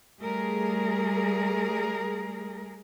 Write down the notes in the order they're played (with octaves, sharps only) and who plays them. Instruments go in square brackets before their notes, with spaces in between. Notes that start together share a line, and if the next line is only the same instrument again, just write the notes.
[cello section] G3 A3 G#4 A#4